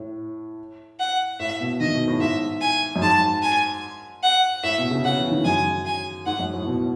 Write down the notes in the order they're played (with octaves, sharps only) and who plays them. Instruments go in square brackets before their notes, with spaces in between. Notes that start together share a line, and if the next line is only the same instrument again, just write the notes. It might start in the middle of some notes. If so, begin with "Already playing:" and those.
Already playing: [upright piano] A2
[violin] F#5
[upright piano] A2 [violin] E5
[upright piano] B2
[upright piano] D#3 [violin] D#5
[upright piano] B2
A2
[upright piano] G#2 [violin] E5
[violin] G#5
[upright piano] F#2
[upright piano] G#2 [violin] A5
[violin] G#5
F#5
[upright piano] A2 [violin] E5
[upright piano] B2
C#3
[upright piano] C#3 [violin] F#5
[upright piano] E3
D#3
[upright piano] F#2 [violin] G#5
[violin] G#5
[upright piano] G#2 [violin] F#5
[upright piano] F#2
A2
B2